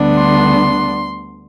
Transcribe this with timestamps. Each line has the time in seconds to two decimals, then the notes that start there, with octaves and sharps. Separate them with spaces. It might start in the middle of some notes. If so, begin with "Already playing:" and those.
Already playing: D2 D3 G3 B3 D4
0.16 C6